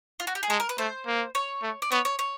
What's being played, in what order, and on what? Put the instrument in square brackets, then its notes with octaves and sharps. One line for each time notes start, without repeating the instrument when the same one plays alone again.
[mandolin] F4
F#4
G4
G#4
[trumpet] G#3 [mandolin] A4
[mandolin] A#4
B4
[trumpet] A3 [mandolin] C5
[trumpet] A#3
[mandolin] C#5
[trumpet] A3
[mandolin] D5
[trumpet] B3 [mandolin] C#5
[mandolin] C#5
C#5